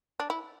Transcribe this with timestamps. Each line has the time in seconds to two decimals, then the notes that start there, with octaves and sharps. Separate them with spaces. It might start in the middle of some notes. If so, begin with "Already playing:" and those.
0.20 D4
0.30 E4